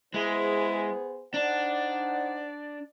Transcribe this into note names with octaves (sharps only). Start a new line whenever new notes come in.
G#3 B3 E4 G#4 C5
D4 D#4 C5 D5 F#5